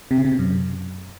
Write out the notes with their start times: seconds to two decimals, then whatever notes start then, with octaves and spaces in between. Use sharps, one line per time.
0.11 C3
0.18 C#3
0.25 C3
0.32 B2
0.39 F#2